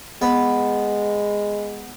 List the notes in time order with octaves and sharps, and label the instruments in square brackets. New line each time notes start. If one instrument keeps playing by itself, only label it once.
[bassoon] G#3 [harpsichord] B3